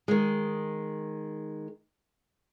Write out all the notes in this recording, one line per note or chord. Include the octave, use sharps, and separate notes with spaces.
D#3 G#3